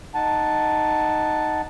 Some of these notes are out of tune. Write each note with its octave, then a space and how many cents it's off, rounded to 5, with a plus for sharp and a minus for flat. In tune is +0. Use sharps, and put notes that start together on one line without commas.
D#4 +0 F#5 +0 A5 +0